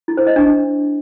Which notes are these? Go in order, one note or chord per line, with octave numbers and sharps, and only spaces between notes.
E4
C5
D#5
D4